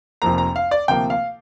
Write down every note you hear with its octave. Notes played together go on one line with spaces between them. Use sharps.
F1 F2 F3 A#3 A#5
A#5
F5
D5
D2 C3 F3 A#3 G5
F5